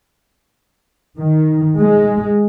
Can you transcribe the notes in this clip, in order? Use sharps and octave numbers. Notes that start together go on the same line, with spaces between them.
D#3
G#3